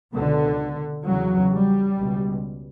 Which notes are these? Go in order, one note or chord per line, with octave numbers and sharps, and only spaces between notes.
C#2 B2 D3
E2 C#3 F#3
G3
C#2 B2